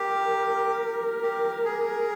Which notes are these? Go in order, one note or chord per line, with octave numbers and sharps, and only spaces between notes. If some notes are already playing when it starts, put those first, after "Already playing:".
Already playing: G4 A#4
G4
G#4